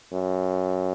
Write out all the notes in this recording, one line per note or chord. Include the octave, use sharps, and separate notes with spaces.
F#2